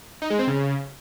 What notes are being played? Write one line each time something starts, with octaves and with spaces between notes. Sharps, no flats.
D#4
G#3
C4
C#3